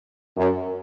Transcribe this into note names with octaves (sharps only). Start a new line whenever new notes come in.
F#2